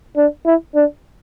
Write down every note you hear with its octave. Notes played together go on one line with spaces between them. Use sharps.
D4
E4
D4